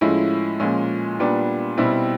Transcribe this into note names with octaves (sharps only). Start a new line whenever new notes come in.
A2 F3 G#3 C#4 E4
A#2 F3 G#3 C#4
A#2 G3 B3 D4
B2 G3 C4 E4